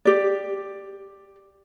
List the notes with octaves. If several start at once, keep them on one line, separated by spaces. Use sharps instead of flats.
G4 D5